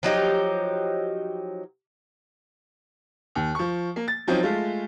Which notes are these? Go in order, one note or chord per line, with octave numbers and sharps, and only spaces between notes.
F3 F#3 D#4 G4
D#2
F3 C#6
A#3
A6
F3 F#3 C4 C#4 D#4
G#3 A3 F4